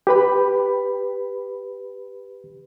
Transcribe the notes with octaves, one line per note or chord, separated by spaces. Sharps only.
G4 B4 B5